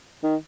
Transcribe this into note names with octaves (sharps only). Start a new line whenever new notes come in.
D#3